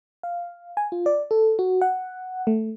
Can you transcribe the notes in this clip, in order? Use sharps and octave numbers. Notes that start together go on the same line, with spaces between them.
F5
G#5
F4
D5
A4
F#4
F#5
A3